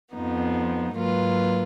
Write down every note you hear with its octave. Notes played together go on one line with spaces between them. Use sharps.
F2 F3 B3 D#4
G#2 F#3 A#3 F4 B4